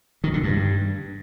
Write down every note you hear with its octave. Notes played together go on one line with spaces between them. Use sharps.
D#3
D3
G2